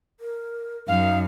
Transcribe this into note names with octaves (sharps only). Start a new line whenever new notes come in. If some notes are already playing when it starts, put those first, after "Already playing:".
A#4
F#2 D#4 F5